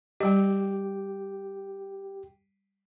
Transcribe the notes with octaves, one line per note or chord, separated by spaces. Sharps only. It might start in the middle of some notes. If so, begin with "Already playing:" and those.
G3 G4 D#5 G5